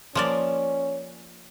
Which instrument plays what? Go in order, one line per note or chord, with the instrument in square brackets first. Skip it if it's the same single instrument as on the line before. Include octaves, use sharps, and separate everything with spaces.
[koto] F3 A#3 D5 [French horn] C#4